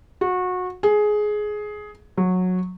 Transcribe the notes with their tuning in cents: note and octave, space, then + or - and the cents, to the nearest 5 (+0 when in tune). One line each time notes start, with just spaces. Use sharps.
F#4 -25
G#4 +15
F#3 -15